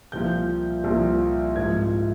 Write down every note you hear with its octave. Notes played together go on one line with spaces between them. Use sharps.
C2 A#2 F3 G6
C2 A#2 F3
G#1 G#2 F3 G#6